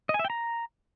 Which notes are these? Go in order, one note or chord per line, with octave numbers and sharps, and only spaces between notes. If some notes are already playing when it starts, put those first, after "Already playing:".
D#5
G#5
E5
G5
A#5